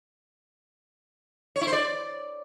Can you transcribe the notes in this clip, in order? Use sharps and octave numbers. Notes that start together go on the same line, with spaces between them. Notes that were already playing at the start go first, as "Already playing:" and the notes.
C#5
E4
C5
D5